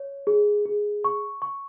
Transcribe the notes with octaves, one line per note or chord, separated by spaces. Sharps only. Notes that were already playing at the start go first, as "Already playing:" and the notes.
Already playing: C#5
G#4
G#4
C#6
C#6